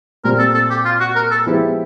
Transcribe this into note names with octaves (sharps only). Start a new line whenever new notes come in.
A#2 G3 C4 A#4
A4
A4
G4
F4
F#4
A#4
A4
F3 G#3 B3 E4 G4